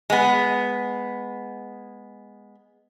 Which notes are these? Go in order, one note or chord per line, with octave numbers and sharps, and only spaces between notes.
G#3 B3